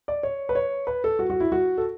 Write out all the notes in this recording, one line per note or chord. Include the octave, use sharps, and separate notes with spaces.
D5
C#5
B4
C#5
B4
A4
F#4
F#4
E4
F#4
A4